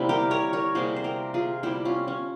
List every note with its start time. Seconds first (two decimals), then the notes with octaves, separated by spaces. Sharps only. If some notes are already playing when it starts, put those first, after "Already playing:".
Already playing: C3 G3 A#3 E4
0.09 G4 A#4
0.31 A#4 C#5
0.53 A#4 C#5
0.75 C3 G3 A#3 G#4 C5
0.96 C5
1.04 G4 A#4
1.34 F4 G#4
1.63 C3 G3 A#3 E4 G4
1.85 C#4 F4
2.08 C#4